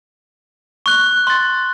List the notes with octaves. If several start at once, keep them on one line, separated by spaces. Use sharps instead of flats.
C#6 F#6 G7
C6 A6